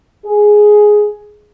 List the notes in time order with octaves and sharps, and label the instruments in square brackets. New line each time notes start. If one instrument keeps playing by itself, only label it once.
[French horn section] G#4